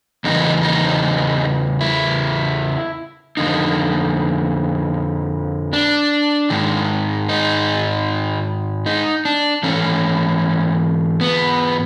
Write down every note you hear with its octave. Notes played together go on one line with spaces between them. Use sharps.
E2 C#3 E3 D#4
D#4
E4
F2 D3 D#4
D4
G#2 D#3
D#4
D#4
D4
G#2 E3 C#4
B3